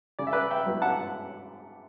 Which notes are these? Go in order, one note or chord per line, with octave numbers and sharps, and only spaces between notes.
C#3 D5
E5
B4 D5
E5 G5
F#3 B3 E4
F#5 A5